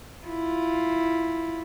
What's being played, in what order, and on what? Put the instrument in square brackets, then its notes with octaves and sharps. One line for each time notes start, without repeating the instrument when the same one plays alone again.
[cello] E4 F4